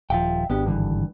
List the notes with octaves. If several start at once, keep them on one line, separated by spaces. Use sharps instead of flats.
D#1 F3 E5 F5 G5
G#1 B3 D4 G4
G2 D3 E3